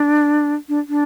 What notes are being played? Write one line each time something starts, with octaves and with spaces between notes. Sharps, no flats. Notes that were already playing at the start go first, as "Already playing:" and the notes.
Already playing: D4
D4
D4